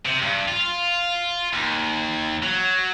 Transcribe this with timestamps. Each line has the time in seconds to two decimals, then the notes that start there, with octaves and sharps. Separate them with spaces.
0.05 C3
0.22 G2
0.49 F4
1.53 D#2
2.43 F#3